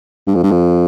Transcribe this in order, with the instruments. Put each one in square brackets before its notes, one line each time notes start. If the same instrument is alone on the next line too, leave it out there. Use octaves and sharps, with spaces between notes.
[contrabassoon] G2
F2
G2
F2